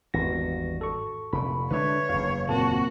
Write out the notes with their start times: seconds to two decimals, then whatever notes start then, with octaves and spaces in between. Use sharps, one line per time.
0.14 G#1 E2 G2 E3 F#4 A#6
0.81 A4 C#6
1.33 F1 A#2 B5
1.71 D3 G#3 D4 B4 C#5 E5
2.09 F#1 E2 F5
2.49 D#2 A#2 A#3 C4 F#4 A5